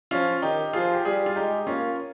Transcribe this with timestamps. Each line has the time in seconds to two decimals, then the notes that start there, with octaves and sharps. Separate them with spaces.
0.11 F3 C#4 F4
0.42 D#3 D#4 G4
0.73 F3 F4 G#4
0.94 G4
1.05 G3 F4 G#4
1.26 F4
1.36 G#3 D#4 G4
1.67 A#3 C#4 F4